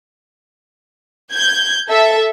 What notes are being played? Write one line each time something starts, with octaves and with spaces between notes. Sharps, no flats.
G6 G#6
A4 E5